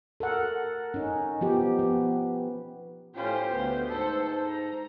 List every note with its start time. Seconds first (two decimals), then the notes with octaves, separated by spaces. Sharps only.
0.20 A4 A#4 F#5
0.94 C#4 D#4
1.41 F3 B3 G4
1.79 B3
3.15 A2 C#4 F4 G4 C5
3.50 D2 B3
3.88 G#2 A4 C5
4.48 A#5